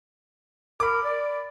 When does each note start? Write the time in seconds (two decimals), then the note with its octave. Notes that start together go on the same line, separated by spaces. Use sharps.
0.80 A#4 B5 D6
1.04 D5